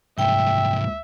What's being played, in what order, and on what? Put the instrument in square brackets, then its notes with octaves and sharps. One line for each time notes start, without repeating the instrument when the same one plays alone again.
[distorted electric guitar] C2 G#2 [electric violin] E5 [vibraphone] G5